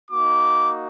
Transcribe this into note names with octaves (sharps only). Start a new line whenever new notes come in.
A#3 D#4 F#4 D6